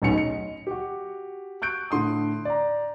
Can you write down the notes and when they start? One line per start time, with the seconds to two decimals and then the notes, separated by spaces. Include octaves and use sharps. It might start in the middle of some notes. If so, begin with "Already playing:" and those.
0.02 D1 B1 B2 C#4 C#7 F7
0.14 D#5 C#7
0.67 F#4 G4
1.62 C#6 F#6 G6 D7
1.91 A2 D3 C6 D#6
2.45 D5 A#5